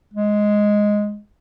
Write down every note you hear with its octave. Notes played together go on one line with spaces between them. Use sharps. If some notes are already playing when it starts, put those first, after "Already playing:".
G#3